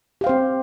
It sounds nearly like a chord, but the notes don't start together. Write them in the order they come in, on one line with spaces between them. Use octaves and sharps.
G4 F5 C5 C4